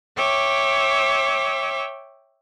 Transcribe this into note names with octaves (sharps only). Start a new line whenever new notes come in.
C#5 E5 G5 D6